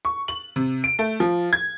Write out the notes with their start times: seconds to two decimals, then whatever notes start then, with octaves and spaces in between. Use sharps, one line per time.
0.05 C#6
0.28 F#7
0.56 C3
0.84 D7
0.99 A3
1.20 F3
1.53 G#6